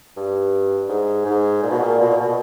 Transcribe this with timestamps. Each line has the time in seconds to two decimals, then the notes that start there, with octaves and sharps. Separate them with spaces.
0.17 G2
0.89 G#2
1.25 G#2
1.63 A#2
1.70 B2
1.78 A#2
1.99 B2
2.10 A#2
2.21 B2